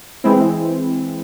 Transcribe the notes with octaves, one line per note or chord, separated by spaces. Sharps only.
E3 G#3 C4 E4